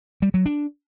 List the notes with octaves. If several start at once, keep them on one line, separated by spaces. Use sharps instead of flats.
G3
F#3
D4